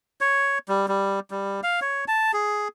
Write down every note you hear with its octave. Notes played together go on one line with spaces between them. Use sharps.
C#5
G3
G3
G3
F5
C#5
A5
G#4